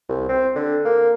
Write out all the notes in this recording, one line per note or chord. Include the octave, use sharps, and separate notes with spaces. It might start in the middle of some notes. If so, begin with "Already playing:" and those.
C2
C4
D3
A#3